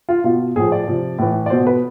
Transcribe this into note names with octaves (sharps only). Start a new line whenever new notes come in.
F4
B2 F4
A2 F3 G#4
D5
C3 F3
A2 E3
D5
B2 C5
B4